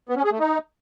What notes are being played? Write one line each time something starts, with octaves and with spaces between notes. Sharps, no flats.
B3
C#4
G#4
A3
D#4